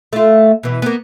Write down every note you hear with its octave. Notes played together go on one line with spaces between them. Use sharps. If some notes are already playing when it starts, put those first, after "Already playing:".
A3 F4
B2 E3
A#3 B3